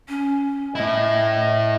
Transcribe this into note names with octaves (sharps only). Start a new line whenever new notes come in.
C#4
A2 E4 D#5